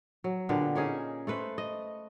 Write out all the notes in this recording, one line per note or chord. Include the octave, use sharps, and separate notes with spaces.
F#3
A#2 D3 B3 G4
A#3 C#4 D#4 G#4
A3 A4 B4 C5
D#5